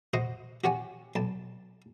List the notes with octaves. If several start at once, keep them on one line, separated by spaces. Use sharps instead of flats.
F#4 C5 D#5 F#5
F#4 G4 C#5 F#5 G#5
B1 A5